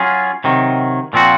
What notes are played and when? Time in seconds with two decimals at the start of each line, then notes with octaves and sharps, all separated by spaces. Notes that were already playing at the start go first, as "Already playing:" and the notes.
Already playing: F#3 C#4 F4 G#4
0.44 C3 D#3 F#3
1.13 A#2 F3 C4 F#4